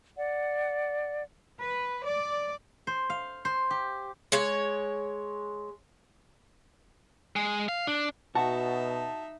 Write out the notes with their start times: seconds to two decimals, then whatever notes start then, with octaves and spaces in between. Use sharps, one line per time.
0.16 D5 F#5
1.61 B4
2.04 D5
2.87 C5
3.10 F5
3.45 C5
3.71 G4
4.32 G#3 C#5
7.36 G#3
7.69 F5
7.87 D4
8.35 B2 D#4 F#4 E5 A5